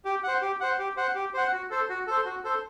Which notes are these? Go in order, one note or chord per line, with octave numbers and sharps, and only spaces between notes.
G4
C5 F#5
G4
C5 F#5
G4
C5 F#5
G4
C5 F#5
F#4
A4 C5
F#4
A4 C5
F#4
A4 C5